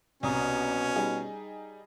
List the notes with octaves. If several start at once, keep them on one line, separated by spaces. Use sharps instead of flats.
C2 B2 C#4 A#5 D#6
G3 D#4 G#4